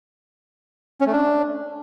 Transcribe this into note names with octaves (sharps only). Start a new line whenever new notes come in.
C#4
A3
D4